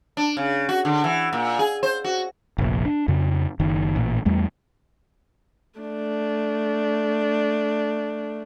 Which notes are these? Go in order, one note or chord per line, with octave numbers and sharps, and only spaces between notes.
D4
C#3
F#4
D3
E3
A#2
G#4
C5
F#4
F1 A#1
D4
F2 C#3
F#1 D#3
A1 A#2
E2 G3 A3
A3 D4